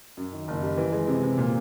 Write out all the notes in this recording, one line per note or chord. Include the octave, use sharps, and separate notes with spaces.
F#2
D#3
F#1
G3
E3
G#3
C3
C3
A#2